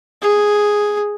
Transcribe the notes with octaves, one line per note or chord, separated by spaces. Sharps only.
G#4